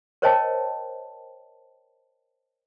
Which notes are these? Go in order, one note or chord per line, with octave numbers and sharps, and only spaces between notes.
A#4 C5 C#5 D#5 G5 A5